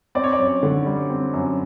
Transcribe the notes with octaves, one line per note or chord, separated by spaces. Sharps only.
C4 D5
C#5
D5
F#2
D3
G3
C4
F#2